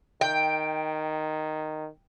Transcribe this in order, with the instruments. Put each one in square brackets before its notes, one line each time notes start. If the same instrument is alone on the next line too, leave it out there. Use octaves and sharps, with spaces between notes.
[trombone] D#3 [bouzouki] G5